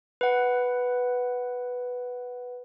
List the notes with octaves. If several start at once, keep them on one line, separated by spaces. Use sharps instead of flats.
B4 F#5